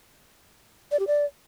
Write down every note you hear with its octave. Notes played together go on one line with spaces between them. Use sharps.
D5
G4
D5